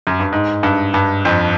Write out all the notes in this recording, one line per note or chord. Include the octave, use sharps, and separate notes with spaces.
F#2
G2
G#2
G2
G2
F2